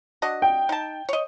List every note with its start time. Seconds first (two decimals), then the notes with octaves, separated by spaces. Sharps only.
0.22 D4 F#4 D#5
0.42 G5
0.69 D#4 A5
1.09 C#5 D#5